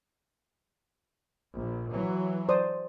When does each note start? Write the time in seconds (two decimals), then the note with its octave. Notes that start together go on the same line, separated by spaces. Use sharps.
1.56 A#1
1.92 E3 F#3
2.49 C5 D5 D#6